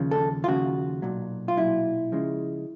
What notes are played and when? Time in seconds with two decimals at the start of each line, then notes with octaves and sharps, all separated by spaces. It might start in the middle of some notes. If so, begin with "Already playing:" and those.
Already playing: D#2 C#3 F3
0.11 A4
0.44 F4
0.48 D#2 C#3 F3 F#4
1.02 B1 A#2 F#3
1.48 F4
1.57 B1 A#2 F#3 E4
2.12 C#3 F3 G#3